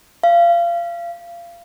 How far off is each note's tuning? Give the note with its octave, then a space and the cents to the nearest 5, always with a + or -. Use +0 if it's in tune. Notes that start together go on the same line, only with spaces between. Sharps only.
F5 -30